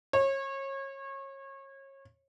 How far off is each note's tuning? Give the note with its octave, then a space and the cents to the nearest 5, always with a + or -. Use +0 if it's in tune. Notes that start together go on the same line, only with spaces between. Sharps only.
C#5 -30